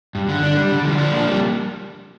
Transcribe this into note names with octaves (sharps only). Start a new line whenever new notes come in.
G2
D3
D4
G3
D3
F3
D4
A#3
G3